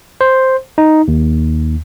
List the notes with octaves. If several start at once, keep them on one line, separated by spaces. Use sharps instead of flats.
C5
D#4
D#2